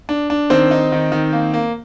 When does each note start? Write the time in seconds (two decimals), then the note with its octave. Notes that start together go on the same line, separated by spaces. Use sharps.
0.09 D4
0.30 D4
0.50 D#3 C4 C5
0.71 D#4
0.92 D#3
1.12 D#3
1.33 A#3
1.54 A#3